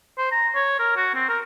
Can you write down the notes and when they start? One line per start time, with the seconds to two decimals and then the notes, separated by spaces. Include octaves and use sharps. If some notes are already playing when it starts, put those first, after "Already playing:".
0.18 C5
0.32 A#5
0.55 C#5
0.79 A#4
0.96 F#4
1.15 C4
1.29 A#4